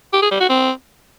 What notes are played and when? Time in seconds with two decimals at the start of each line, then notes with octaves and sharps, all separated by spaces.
0.13 G4
0.22 G#4
0.31 G3
0.40 F#4
0.49 C4